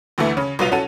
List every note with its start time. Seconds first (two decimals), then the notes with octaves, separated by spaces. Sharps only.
0.18 D2 D3 E3 A3
0.37 C#3 C#4
0.59 C2 B2 F#3 F4 D#7 F7
0.72 C#4 F#4 A4 D#7